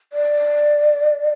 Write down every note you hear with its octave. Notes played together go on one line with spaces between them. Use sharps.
D5